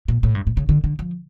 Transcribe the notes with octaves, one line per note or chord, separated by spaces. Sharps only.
A#2
A2
G2
A2
C#3
D3
D3
F3